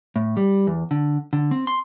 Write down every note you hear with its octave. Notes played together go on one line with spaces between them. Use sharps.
A2
G3
E2
D3
D3
C4
C6